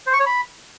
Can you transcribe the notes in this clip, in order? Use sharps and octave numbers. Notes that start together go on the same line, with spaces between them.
C5
C#6
C#5
B5